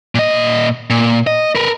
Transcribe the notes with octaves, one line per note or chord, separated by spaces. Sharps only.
A#2 D#5
A#2
D#5
A#4 B4